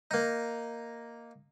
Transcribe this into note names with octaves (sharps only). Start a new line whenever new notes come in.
A#3 D#4